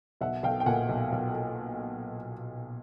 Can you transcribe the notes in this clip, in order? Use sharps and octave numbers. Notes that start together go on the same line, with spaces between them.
B1 E5 F#5
B1 F5 G5
G5
A#2 F#5 G#5
B1
B1